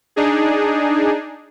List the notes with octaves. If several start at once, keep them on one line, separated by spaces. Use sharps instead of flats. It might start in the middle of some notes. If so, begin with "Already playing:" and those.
D4 D#4 G#4